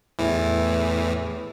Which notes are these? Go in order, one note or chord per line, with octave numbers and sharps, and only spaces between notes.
E2 A2 E3